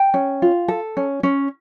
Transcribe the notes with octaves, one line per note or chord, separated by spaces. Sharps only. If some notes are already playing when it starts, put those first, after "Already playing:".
Already playing: G5
C#4
F4
A4
C#4
C#4